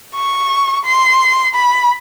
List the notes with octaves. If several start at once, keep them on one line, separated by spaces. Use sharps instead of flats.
C#6
C6
B5